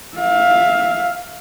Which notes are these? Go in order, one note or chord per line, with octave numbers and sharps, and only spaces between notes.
E5 F5